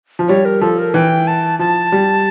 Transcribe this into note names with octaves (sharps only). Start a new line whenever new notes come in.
F3
G3 C#5
A#4
F3 A4
A#4
E3 G5
A5
F3 A5
G3